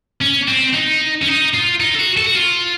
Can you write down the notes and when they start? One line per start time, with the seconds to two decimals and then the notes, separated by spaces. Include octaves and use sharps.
0.21 C#4
0.48 C4
0.74 D#4
1.22 C#4
1.28 D#4
1.54 F4
1.80 D#4
1.95 A4
1.99 F#4
2.17 A4
2.26 F#4
2.35 F4